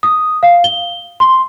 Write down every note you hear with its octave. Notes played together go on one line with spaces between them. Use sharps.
D#6
F5
G7
C6